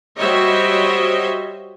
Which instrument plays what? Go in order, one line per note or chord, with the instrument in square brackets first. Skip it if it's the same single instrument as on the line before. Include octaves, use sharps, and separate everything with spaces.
[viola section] G3 F#4 C5 C#5 D#5 E5